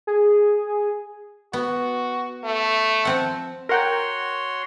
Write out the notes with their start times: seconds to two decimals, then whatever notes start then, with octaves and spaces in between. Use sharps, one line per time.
0.07 G#4
1.53 B3 F#4
2.44 A3
3.05 F3 C4 F#5
3.69 F#4 A#4 C#5 F#5 G5 C6